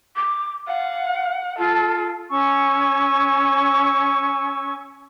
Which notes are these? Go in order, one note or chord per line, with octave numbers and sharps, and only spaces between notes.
D6
F5 F#5
F4 A4
C#4 G#5 C#6 E6